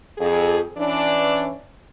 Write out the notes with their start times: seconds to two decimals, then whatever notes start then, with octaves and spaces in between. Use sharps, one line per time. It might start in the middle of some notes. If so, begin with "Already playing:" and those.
0.18 F2 G#4
0.78 E3 C#4 D4